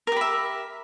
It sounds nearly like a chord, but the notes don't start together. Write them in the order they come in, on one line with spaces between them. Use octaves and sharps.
A#4 G4 B5 E5